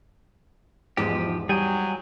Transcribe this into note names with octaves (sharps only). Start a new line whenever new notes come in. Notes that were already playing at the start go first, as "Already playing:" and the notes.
E2 G#2 F3 G4
F#3 G3 G#4 G5 G#5